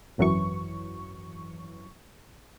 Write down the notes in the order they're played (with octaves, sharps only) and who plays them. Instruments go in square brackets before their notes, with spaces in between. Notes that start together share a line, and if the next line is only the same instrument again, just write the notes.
[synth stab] G#1 F#2 E3 F#3 C#6